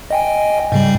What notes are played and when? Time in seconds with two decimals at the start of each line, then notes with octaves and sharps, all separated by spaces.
0.11 D#5 G5 G#5
0.72 G#2 C#3 G3